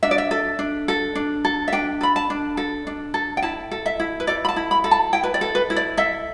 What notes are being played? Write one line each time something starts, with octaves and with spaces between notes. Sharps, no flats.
D4 E5
D5
E5
A4
D4
A4
D4
A4
E5
D4 G5
A4 B5
A5
D4
A4
D4
A4
G5
E4 A5
A4
E5
E4
B4
A4 D5
B5
A5
E4
B5
A4
A5
E4 G5
B4
D5
A4
B4
E4
D5
A4 E5